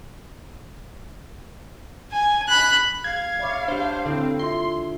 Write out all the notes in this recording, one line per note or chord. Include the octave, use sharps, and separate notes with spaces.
G#5
B5 F#6
F5 G#6
C#5 D5 E5 B5 D6
D4 G4 C5
D3 C4 E4 A4
F4 E5 C6